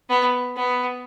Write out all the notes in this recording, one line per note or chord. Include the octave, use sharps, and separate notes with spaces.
B3
B3